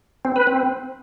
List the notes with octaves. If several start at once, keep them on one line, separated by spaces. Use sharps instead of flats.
C4
B4
C4